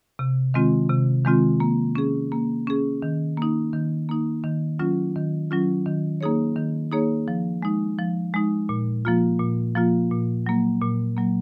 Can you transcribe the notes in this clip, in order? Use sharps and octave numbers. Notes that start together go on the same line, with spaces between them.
C3
D#3 G#3 C4 F4
C3
D#3 G#3 C4 F4
A#3
C#4 G#4
A#3
C#4 G#4
D#3
A#3 D#4
D#3
A#3 D#4
D#3
F#3 C#4 F4
D#3
F#3 C#4 F4
D#3
A#3 D#4 G#4 C#5
D#3
A#3 D#4 G#4 C#5
F3
G#3 D#4
F3
G#3 D#4
A#2
F3 A#3 F4
A#2
F3 A#3 F4
A#2
F#3 A#3
A#2
F#3 A#3